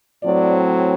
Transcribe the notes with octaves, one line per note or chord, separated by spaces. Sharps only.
A2 F#3 C4 D5